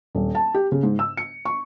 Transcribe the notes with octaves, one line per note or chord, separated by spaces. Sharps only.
D#1
A5
G4
C#3
G#2
E6
C#7
C#6